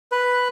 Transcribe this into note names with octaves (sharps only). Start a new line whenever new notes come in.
B4